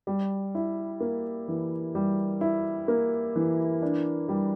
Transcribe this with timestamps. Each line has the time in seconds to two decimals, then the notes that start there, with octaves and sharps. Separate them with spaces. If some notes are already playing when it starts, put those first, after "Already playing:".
0.07 G3
0.55 E4
1.00 A#3
1.48 E3
1.95 G3
2.41 E4
2.88 A#3
3.36 E3
3.82 D4
4.29 G3